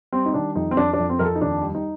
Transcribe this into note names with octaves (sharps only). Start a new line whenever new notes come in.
G3 C4
D#4
D#3 D4
F2 D#4
C4
F2 D4
D4
F2
C4
F2 A#4
A4
D#4
D#2 D4
G3
D#4